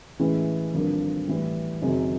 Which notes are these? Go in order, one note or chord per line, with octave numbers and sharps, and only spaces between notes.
A2 E3 G#3 C#4 E4
G#1 G2 D3 F3 A#3
A2 E3 G3
F#1 F#2 D#3 G#3 C4